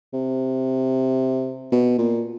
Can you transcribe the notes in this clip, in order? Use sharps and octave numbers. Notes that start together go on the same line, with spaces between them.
C3
B2
A#2